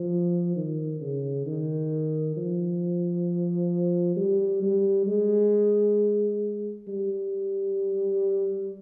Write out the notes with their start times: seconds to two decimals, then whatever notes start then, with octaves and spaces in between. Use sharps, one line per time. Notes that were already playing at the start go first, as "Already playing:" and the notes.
Already playing: F3
0.56 D#3
1.01 C#3
1.46 D#3
2.37 F3
4.17 G3
4.62 G3
5.07 G#3
6.88 G3